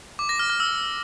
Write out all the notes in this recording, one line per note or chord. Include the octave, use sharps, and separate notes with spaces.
D6
A#6
F6
F6
E6